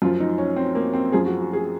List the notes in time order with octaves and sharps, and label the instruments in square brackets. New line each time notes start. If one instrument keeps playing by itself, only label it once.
[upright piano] F#2 F3 F4
D#4
C#4
C4
A#3
C4
F#2 F3 G#4
F#4
F#4
G#4